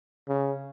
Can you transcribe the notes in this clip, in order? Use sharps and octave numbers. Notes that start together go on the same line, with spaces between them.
C#3